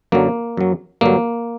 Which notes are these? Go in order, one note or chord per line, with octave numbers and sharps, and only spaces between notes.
F#2 D3 F#3 A#3
F#2 F#3
G2 D3 F#3 A#3